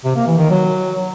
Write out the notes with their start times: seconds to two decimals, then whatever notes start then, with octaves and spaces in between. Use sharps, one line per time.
0.04 C3
0.16 A#3
0.27 E3
0.38 D#3
0.50 F#3